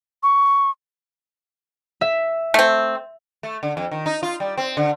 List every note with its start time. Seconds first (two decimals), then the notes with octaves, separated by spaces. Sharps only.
0.23 C#6
2.01 E5
2.54 A3 C4
3.43 A3
3.63 D3
3.77 F2
3.91 D#3
4.06 D#4
4.23 F4
4.40 G3
4.58 C4
4.77 D3